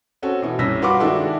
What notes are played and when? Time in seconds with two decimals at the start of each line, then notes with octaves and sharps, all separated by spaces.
0.22 C4 C#4 F#4 A4
0.42 B2 E3
0.59 C2 G2 C#4 E6 A#6 B6
0.82 F4 F#4 B4 F#5 D6
1.00 D#3 G#3 D4 E4 F#4 A4